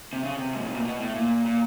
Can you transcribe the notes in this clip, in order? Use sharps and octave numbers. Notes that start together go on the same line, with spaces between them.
C3
C#3
C3
G#2
A2
A#2
B2
A2
A#2
A#2